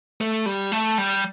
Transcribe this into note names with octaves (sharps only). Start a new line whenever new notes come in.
A3
G3
A3
G3